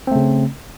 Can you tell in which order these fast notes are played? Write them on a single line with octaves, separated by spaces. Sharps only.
C4 A3 C#3